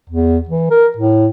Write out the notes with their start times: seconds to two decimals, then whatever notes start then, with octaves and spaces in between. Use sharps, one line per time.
0.10 E2
0.49 E3
0.71 A#4
0.97 A2